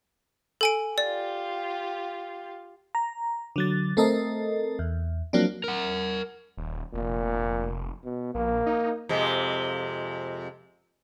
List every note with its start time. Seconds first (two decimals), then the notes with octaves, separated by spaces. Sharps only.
0.61 A4 G#5 D7
0.98 F4 G4 D5
2.95 A#5
3.56 D3 F#3 A6
3.97 A3 C4 A4 A#4 D#5
4.79 E2
5.33 F3 F#3 A#3 C4 D4
5.64 A#4 F#5
6.57 D#1
6.94 F1 A#2
8.05 B2
8.35 A#1 A#3
8.66 D#4
9.09 F2 C3 G#3